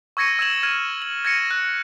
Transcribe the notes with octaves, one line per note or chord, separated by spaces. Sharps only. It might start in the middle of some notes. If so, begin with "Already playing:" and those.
C#6 E6 G#6 A#6 C#7 D#7
E6 G#6 E7 F#7
F6 G#6 D#7 F#7
F#7
G#6 A#6 C#7 D#7
F#6